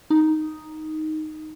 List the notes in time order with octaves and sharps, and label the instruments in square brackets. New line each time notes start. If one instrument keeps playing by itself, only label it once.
[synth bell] D#4